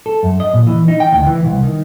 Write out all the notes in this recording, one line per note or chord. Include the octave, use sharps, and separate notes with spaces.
A4
F#2
D#5
A#2
E3
D#4
G5
D2
E3
C2
D#3